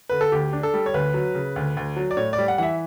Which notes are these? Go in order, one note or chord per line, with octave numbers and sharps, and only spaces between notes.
D3 B4
A4
D2 G4
D4
A4
G3
C#5
D2 B4
F#3
C#3
D2
D2
F#3
D5
A2 C#5
D5
G3
F#5
E3 E5 F#5